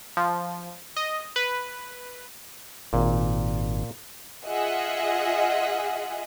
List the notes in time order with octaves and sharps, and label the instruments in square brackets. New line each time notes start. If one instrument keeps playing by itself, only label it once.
[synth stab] F3
D#5
B4
[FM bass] G#1 [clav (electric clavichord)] A#2
[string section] F4 G#4 D#5 E5 F#5